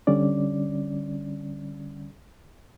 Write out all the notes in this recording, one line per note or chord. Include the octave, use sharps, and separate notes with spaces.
D3 G3 C#4 D5